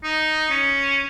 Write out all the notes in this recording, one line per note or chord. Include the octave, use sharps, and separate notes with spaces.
D#4
C#4